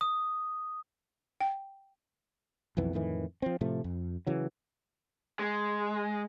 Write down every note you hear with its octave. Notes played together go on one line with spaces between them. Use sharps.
D#6
G5
B1 F2 E3 B3
F2 A2 D#3 E3
F3 C4
A2 C3 F3 A3
F2
C#3 E3 F#3
G#3